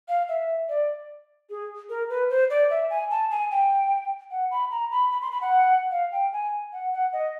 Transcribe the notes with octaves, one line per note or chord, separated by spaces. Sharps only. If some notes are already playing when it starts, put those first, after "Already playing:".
F5
E5
D5
G#4
A#4
B4
C5
D5
E5
G#5
A5
G#5
G5
F#5
B5
A#5
B5
B5
C6
B5
F#5
F5
G5
G#5
F#5
F#5
D#5